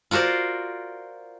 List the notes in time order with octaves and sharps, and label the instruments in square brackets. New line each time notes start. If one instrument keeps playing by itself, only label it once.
[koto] F4 F#4 A#4 C5 D5